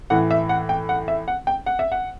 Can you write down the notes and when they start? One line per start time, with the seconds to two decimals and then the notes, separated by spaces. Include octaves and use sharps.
0.10 A2 E3 F#5
0.31 E5
0.49 F#5
0.69 G5
0.89 F#5
1.08 E5
1.28 F#5
1.47 G5
1.66 F#5
1.79 E5
1.92 F#5